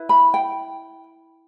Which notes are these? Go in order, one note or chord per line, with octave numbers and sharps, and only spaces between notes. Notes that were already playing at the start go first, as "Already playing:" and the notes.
Already playing: E4 B4
B5
G5